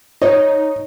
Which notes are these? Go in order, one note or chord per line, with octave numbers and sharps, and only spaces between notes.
D#4 C#5